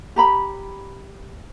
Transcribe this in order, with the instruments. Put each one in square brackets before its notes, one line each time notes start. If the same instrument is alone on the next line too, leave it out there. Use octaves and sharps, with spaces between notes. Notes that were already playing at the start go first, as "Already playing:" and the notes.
[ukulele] G4 A#5 B5